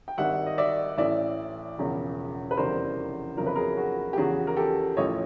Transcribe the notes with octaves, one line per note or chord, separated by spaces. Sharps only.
G5
G#1 G2 D#3 G3 E5 F#5
D#5
D5 E5
A1 A2 E3 D5 E5
E1 E2 C#3 F3
B4
F1 E2 C#3 E3 G3 A#4 C5
G1 F2 C#3 F#3 A#4
B4
G#4 A#4
F#4 G#4
G4
E2 C#3 F3 F#4 G#4
A#4
G4 A4
A1 A2 F3 C#5 D#5